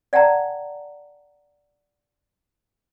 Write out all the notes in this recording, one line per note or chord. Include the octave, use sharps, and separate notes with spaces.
D5 F#5 G5 A5 A#5